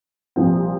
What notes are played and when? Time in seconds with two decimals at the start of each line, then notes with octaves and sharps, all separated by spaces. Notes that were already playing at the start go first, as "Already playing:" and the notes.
0.36 C2 A#2 F3 C4